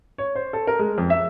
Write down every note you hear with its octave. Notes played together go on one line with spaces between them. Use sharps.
C#5
C5
A4
A#4
G#3
F2
E5